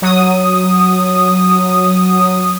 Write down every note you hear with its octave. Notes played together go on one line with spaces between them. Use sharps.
F#3 D#6